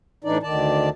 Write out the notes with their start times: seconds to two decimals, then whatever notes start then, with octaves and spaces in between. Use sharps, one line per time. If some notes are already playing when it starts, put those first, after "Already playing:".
0.24 A2 E3 D4 D#4 D5
0.43 D2 D#3 D5 A5